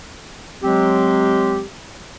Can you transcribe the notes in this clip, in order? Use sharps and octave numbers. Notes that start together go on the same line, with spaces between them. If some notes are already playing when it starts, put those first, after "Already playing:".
F#3 G#3 C4 G4